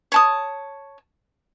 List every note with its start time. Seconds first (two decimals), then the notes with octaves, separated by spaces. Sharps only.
0.12 C#5 A5 D#6